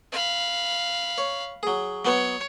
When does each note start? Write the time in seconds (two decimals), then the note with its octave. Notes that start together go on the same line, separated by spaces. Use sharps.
0.12 F5 B5
1.18 C#5
1.63 F#3 G#4
2.05 F#3 B3 C#5